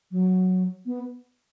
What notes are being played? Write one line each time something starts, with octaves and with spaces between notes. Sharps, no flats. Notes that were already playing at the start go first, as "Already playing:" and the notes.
F#3
B3